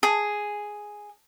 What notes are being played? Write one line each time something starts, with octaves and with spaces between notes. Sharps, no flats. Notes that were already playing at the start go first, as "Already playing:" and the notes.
G#4